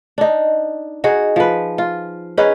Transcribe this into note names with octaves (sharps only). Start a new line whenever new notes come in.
D4 D#4
D#4 F#4 G#4
F3 B4
F4
C#4 D#4 G#4 B4